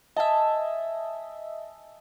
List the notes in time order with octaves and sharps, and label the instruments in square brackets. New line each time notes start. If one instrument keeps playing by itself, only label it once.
[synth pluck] D#5 E5 [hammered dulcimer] G#5 A5